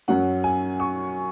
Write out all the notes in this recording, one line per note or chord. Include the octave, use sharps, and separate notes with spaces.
F#2 F#3 C#4 F#5
G#5
C#6